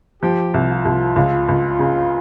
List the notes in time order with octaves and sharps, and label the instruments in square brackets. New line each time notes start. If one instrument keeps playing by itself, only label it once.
[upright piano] F3 [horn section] G4
[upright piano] C2
[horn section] F4
[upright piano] C2
C#2
C#2
C#3